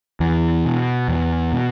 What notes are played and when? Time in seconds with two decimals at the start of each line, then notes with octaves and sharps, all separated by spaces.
0.20 E2 E3
0.65 B2
1.08 E2
1.52 B2